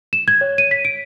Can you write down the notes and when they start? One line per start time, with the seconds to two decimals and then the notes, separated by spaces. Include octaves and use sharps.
0.13 E7
0.28 G#6
0.41 C#5
0.58 D#7
0.71 B6
0.85 D7